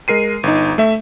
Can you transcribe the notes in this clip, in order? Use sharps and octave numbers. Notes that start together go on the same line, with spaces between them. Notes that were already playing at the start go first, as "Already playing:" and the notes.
G#3 A#4 C7 D#7
G1 D#4
A3 E5